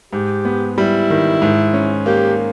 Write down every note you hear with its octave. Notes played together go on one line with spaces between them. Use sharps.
G#2 G4
B3
G3 E4
D#3
G#2
C#4
A#3 G4